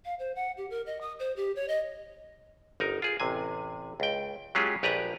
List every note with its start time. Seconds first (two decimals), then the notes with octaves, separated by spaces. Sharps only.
0.05 F5
0.19 C5
0.35 F#5
0.57 G4
0.70 A#4
0.86 D#5
1.01 D#6
1.19 C5
1.36 G4
1.56 C#5
1.68 D#5
2.80 G1 D#4 A#4
3.02 F4 G#4
3.20 A1 C3 G#5
4.00 C#2 G5
4.55 F#3 G#3 C#4 F4 G4 G#4
4.83 A#1 G4 B4 D5 G#5 A#5